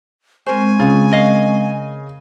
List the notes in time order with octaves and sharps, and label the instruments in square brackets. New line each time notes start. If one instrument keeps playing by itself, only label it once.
[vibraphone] G#3 C4 C#6 [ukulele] A#4 C5 [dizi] G#5
[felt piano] C#3 [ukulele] F4
[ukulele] A#4 D#5 F5